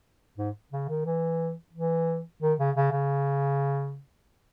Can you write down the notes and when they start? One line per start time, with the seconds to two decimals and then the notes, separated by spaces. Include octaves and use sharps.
0.38 G#2
0.72 C#3
0.88 D#3
1.05 E3
1.73 E3
2.42 D#3
2.59 C#3
2.76 C#3
2.92 C#3